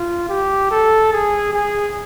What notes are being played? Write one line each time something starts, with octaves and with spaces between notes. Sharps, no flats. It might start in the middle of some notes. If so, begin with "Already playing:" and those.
Already playing: F4
G4
A4
G#4
G#4